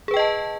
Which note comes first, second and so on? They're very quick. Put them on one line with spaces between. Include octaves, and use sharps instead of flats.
G#4 B4 G5 D#5 A5